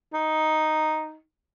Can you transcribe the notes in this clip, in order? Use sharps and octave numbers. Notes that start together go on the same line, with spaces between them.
D#4